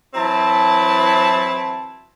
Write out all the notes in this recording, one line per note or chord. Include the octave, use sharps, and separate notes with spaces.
E3 F#3 C4 E4 A5